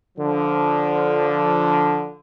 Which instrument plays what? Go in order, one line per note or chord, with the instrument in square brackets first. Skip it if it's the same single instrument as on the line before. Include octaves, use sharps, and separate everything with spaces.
[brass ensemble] D3 F3